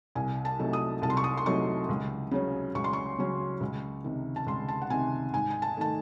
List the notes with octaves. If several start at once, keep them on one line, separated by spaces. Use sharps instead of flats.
C2 G#5
A5
C3 F#3 A3 D#4
D#6
C2 A5
C6
C#6
D#6
C6
C3 F#3 A3 D#4 C#6
C#2
C#3 F#3 C#4
C#2 C#6
C6
C#6
C#3 F#3 C#4
C#2
C3 D#3
A5
C#2 C6
A5
F#5
C3 D#3 G#5
G#2 G#5
G#5
A5
D#3 A3 A5